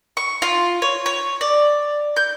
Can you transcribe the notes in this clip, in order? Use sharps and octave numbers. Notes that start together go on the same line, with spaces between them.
C#6
F4
C#5
C#5
D5
G6